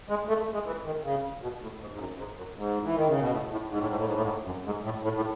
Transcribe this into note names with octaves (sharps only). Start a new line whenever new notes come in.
G#3
A3
G#3
E3
D#3
C#3
B2
A2
G#2
G#2
F#2
G#2
F#2
G#2
E3
D#3
C#3
B2
A2
A2
G#2
A2
G#2
A2
G#2
A2
G#2
F#2
G#2
A2
A2
A2